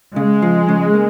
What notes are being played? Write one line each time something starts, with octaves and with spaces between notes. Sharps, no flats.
C#3 G#3
F3
C#3
A#3